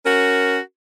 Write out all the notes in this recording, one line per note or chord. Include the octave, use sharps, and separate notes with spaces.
C#4 F#4 A#4